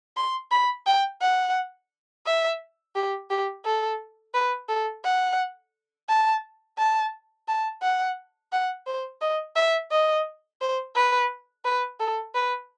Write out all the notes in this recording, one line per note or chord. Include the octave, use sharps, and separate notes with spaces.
C6
B5
G5
F#5
E5
G4
G4
A4
B4
A4
F#5
A5
A5
A5
F#5
F#5
C5
D#5
E5
D#5
C5
B4
B4
A4
B4